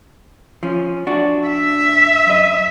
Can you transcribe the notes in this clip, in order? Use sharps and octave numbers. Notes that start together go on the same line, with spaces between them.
F3 C#4
D4 F#4
E5
F#2 D#5